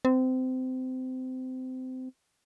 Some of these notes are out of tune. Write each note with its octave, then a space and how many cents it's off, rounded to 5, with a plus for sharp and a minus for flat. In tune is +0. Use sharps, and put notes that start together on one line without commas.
C4 -25